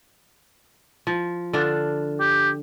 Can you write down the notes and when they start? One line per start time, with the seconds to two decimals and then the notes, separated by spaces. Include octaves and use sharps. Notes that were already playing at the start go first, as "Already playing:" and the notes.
1.07 F3
1.53 D3 D4 F4
2.20 G4